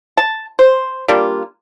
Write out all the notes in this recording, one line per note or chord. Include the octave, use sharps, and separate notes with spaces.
A5
C5
G3 A#3 D4 F4